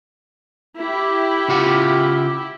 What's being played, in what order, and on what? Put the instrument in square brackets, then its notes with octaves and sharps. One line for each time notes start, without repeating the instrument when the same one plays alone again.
[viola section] E4 G4
[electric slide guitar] C#3 F4 F#5